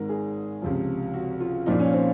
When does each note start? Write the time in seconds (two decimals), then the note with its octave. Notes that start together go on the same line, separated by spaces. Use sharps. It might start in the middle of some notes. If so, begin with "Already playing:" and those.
Already playing: G#1 G#2 D#3 A#4
0.09 G#4
0.62 C#2 C3 F3
1.14 F#4
1.40 F4
1.66 A#1 A#2 F3 D#4
1.80 C#4
1.93 C4